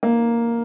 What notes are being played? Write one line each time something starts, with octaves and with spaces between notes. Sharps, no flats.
A#3